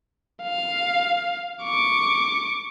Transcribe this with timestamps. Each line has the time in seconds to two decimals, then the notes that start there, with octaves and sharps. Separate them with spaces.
0.43 F5
1.63 C#6 D6